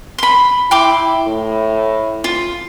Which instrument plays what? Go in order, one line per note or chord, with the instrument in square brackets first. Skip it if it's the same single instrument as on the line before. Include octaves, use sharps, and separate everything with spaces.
[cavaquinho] B5 C6
[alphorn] E4 [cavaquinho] G5 C6 D6
[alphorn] A2
[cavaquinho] F4